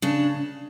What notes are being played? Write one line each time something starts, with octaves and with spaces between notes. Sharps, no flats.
C#3 D4